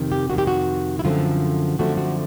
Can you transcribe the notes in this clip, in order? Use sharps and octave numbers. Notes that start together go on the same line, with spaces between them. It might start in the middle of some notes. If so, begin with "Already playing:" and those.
Already playing: F2 C3 D#3
G4
F2 C3 D#3 F#4
G4
F#4
E4
F#2 D3 F3 A3 C4 F4
F#2 D3 F3 A3 C4 F#4
F#4